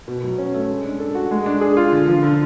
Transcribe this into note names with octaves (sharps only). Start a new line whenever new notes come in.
B2
F#3
C#4
A3
G#3
D4
A4
F#4
G#3
D4
G#4
F4
D3
F3
D3